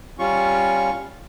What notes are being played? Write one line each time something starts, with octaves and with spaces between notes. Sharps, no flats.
G3 C#4 F4 C#6